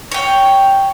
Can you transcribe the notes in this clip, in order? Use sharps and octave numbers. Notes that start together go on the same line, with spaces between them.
C#5 G5